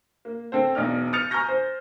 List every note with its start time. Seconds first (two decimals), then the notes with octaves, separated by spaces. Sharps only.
0.25 A#3
0.52 C4 A4 C5
0.75 E1 B1 D#4 D5 F6
1.13 D#6 F6 G6 A6 C#7 F7
1.31 G#5 A#5 C#6 F6 G6 A#6
1.49 C5